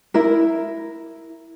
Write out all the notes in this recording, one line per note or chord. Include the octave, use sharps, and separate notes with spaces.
E4 A#4